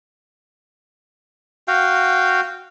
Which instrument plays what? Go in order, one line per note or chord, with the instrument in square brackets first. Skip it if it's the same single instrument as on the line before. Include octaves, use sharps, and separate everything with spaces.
[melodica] F#4 F5 G5